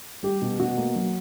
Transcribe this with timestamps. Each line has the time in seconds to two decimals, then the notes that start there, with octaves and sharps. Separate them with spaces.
0.23 G3 G4
0.42 B2
0.59 B2 F#4
0.77 A#3
0.95 F#3